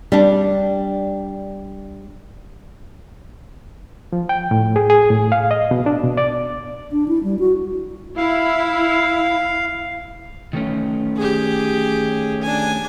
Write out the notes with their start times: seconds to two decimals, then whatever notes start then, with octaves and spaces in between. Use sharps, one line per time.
0.12 G3 D4
4.13 F3
4.29 G5
4.51 A2
4.76 G#4
4.90 G#4
5.10 A2
5.32 F5
5.51 D#5
5.71 B2
5.86 D4
6.04 B2
6.17 D5
6.92 D4
7.08 E4
7.24 G3
7.39 F#4
8.17 E4 F5
10.53 D#3 A3 C#4
11.16 G4 G#4
12.42 D4 G#5